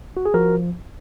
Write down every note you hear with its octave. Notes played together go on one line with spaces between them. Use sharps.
F#4
G#4
F3 F#4 A#4